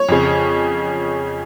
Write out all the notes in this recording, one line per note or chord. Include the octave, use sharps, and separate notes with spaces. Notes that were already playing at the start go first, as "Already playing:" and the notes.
Already playing: C#5
F2 C#3